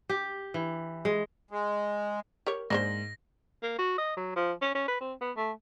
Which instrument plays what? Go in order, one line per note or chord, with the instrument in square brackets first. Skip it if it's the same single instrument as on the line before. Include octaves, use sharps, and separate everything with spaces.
[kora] G4
E3
G#3
[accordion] G#3
[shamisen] G4 A#4 C#5
[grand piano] G#2 [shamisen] A#3 D4 C5 [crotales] A#6
[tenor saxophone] A#3
F#4
D#5
F#3
F3
C#4
C#4
B4
C4
B3
A3